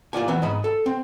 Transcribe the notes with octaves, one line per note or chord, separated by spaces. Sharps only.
A#3 F4 D5 G#5
E3 B3 C4
G#2 D#5 B5
A4
C4